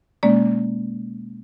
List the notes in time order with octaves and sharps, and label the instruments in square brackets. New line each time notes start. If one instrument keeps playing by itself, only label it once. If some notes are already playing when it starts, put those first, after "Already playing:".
[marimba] B2 G#3 A#3 C#4 D5